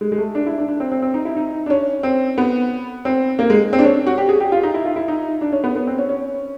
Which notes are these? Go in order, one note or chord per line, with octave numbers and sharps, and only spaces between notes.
G#3
G#3
A3
D4
E4
D4
D4
C4
C4
C4
D#4
E4
D#4
D4
C#4
C4
B3
C4
A#3
G#3
C4
D4
C#4
F#4
G4
G#4
G4
F4
D#4
E4
F4
E4
D#4
D4
C#4
B3
B3
C4
C#4
C#4